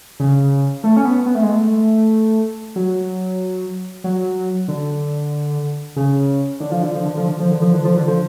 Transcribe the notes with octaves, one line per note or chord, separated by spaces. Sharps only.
C#3
A3
C#4
B3
B3
A3
G#3
A3
F#3
F#3
D3
C#3
D3
F3
D3
F3
D3
F3
D3
F3
D3
F3
D3
F3
D3
F3